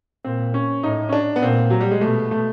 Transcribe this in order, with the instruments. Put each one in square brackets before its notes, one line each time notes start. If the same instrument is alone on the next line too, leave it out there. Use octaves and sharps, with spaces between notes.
[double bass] A#2 [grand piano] C4
[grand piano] C#4
[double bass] A2 [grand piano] D#4
[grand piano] C#4
D4
B3
[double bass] A#2 [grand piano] C4
[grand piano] F#3
G3
G#3
[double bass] B2 [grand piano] A3
[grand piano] A3